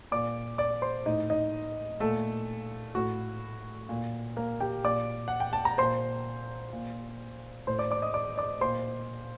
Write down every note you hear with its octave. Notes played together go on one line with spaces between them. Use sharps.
A#2 D5 D6
D5 D6
C5 C6
A2 D#4 D#5
D#4 D#5
A#2 A3 A4
A2 F#4
A#2
A#3 A#4
G4 G5
A#2 D5 D6
F#5
G5
A5
A#5
A#2 C5 C6
A#2
A2 C5 C6
D5 D6
D5 D6
D#5 D#6
D5 D6
D5 D6
A#2 C5 C6